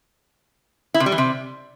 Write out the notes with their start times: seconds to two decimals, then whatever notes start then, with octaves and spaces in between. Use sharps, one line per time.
0.94 E4
1.00 C3
1.06 G3
1.12 E3
1.18 C3